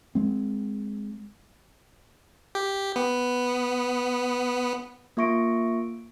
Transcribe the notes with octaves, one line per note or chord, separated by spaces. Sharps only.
G#3 C4
G4
B3
A#3 F4 E5 C#6 A#6 D7